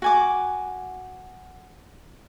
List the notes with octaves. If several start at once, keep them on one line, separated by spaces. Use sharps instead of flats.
F#4 G#5 D6